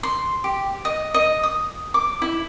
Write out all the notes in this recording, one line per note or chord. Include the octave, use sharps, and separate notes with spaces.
C6
G4
D#5
D#5
D#6
D6
E4